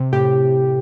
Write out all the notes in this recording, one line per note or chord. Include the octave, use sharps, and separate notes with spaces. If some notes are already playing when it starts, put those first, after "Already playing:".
Already playing: C3
A2 G4